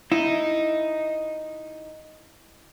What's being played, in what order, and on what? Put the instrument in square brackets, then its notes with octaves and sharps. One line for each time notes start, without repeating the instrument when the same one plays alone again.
[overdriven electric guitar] D#4 [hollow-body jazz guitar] E4